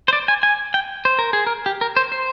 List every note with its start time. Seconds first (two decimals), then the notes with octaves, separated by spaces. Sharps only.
0.08 C5
0.13 D5
0.28 G#5
0.43 G#5
0.74 G5
1.05 C5
1.19 A#4
1.33 G#4
1.47 A#4
1.66 G4
1.81 A#4
1.97 C5
2.12 C5